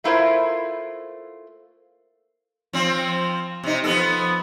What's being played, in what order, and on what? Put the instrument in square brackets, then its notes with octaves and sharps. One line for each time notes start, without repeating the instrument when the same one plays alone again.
[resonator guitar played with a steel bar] A3 A#3 E4 F4 A#4 C5
[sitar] F3 C4
C3 D#4
F3 B3 A4